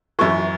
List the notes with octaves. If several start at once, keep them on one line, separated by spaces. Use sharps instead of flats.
F#2 E3 C#6